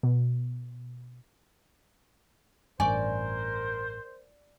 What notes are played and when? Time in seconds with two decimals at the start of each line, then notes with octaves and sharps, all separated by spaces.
0.03 B2
2.80 A1 G2 A#4 C5 D5 G#5 C#6